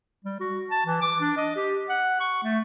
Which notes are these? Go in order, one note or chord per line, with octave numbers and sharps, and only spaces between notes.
G3
F#4
A5
E3
D6
D4
D#5
G4
F#5
C#6
A3